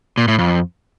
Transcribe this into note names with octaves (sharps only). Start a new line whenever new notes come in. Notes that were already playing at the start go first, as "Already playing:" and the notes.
A#2
A2
F2